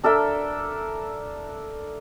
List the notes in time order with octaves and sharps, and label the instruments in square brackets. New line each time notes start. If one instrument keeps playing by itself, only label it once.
[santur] D4 A4 A#4 E5